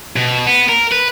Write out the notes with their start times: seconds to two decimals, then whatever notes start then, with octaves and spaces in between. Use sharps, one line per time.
0.16 B2
0.46 B3
0.68 A#4
0.91 B4